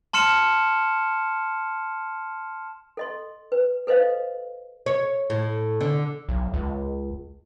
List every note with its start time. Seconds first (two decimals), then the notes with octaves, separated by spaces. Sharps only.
0.13 A5 C6 F6 C#7 E7
2.97 A4 D#5 C6
3.52 B4
3.87 A4 B4 C5 D#5 F5
4.86 C#5
5.30 A2
5.81 D3
6.29 B1
6.54 C#2